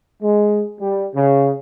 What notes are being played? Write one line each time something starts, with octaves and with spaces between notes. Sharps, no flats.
G#3
G3
C#3